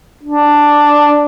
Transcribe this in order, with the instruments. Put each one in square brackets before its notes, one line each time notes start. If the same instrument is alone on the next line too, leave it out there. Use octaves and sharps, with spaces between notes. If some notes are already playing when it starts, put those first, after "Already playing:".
[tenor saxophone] D4